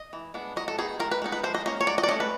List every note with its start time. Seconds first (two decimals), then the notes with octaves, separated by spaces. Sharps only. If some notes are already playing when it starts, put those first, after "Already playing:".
Already playing: D#5
0.13 E3
0.34 G#3 B3 D4
0.56 F#3 D#5
0.68 A4
0.78 B3 D#4 G#4
1.00 D#3 A#4
1.11 B4
1.22 G#3 B3 D#4
1.32 B4
1.43 F3 C5
1.55 D#5
1.66 A#3 C#4 D#5
1.81 C#5
1.87 F#3 D5
1.98 D#5
2.03 D5
2.08 C#4 D#5
2.11 A3
2.20 B4